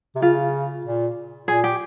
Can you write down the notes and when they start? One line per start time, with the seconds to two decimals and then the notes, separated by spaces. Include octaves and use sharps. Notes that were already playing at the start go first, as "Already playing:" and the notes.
0.15 C3
0.22 C#3 F4
0.85 A#2
1.48 A#2 G#4
1.64 G4